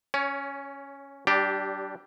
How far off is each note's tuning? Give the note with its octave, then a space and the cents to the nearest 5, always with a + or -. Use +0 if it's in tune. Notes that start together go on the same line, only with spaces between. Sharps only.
C#4 +0 C#5 +25
G3 -30 D4 +0 G4 +0